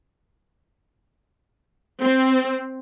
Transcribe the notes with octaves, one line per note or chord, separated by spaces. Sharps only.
C4